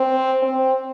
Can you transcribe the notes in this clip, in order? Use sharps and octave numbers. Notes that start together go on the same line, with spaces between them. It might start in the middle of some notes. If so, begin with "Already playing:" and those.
Already playing: C4
C4